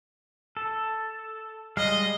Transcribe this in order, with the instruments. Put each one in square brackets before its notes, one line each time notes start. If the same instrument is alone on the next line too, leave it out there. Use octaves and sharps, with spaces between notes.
[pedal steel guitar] A4
[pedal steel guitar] G3 G#3 F5 [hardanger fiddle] D#5